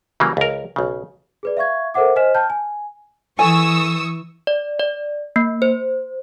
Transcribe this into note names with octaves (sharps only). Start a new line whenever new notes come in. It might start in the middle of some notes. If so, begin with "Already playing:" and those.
C#3 E3 F#3 G3 A#3
C#2 A#4
B1 C#3
G#4 B4 D5
E5 F5 C#6 G#6
A4 A#4 C5 E5 F#5 D6
C5 D#5 G#5 F6 B6 E7
G5 A5 F6 G6
G#5
E3 A4 G#5 C#6 D#6 E6
D5
D5
A#3
C5